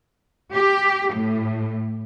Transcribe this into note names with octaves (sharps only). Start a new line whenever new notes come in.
G4
A2